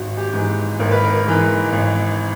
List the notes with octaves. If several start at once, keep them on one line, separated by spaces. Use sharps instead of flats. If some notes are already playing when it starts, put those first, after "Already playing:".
Already playing: G#1 F#4
G4
G#2 E3
G#1 A#4
B4
A#4
G#2 E3
G#1